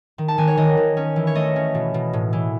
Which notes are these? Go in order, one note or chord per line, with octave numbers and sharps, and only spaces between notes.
D#3
A5
D#3 G#5
C#5
D#3 D#5
D#3
C#4
E3
C#5
A3 D#5
C#4
B2
B2
A2
E3